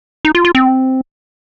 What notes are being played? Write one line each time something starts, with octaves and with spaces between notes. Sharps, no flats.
D#4
F4
F4
C4